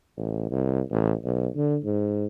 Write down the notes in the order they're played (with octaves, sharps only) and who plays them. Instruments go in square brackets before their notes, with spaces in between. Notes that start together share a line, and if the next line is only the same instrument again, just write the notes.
[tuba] A1
C2
A1
B1
D3
G#2